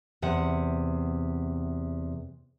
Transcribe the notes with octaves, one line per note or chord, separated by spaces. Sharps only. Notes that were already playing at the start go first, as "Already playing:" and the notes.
E2 C3 F#5